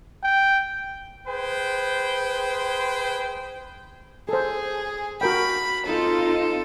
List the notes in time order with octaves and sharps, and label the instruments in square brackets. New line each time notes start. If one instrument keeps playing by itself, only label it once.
[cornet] G5
[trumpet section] G#4 B4 C5 G5
[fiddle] G#4 [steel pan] A4 C5
[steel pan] F#4 A#4 G5 [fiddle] B5
[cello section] C4 D#4 F4 [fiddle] A4